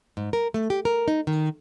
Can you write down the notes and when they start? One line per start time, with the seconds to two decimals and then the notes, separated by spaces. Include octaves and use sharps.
0.17 G#2
0.33 A#4
0.54 A3
0.70 G4
0.85 A#4
1.08 D#4
1.27 D#3